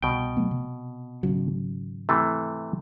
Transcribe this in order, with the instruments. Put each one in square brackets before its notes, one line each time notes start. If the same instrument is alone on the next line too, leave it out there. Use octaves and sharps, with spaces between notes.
[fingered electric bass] C2 [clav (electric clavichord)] B2 G5
[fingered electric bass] F#3 A3 B3
C3
G#1 C#3 F#3
[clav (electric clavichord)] C3 E3 A3